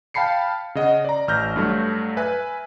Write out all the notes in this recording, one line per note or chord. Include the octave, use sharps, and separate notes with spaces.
F5 G5 A5 B5 C7 C#7
C#3 D#5 F#5
D5 A#5
A1 F6 G6 A#6
G2 F#3 A3
B4 E5 G#5 F#6